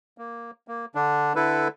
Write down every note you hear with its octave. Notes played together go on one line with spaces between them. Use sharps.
A#3
A#3
D3 D4
D3 E4 A4 B4